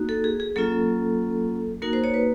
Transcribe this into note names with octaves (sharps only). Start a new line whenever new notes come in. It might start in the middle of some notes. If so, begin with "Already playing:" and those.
Already playing: A#3 D#4 F#4
A4
G#4
G#4
F#3 A#3 C#4 F4 A4
A#3 D#4 F#4 A#4
C5
C#5
B4